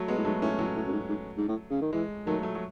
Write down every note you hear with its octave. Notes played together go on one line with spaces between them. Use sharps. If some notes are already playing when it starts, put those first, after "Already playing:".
Already playing: F#3 A3
B2 G#3 B3
A2
G#2 F#3 A3
A2 A3 C#4
A2 F#3 A3
A2
F#2
G#2
G#2
G#2
A2
C#3
D#3
E3 G#3
D#3 F#3 A3
F#3 A3
F#3